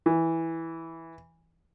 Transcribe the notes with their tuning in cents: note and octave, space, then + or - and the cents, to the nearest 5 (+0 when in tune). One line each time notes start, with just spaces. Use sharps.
E3 -5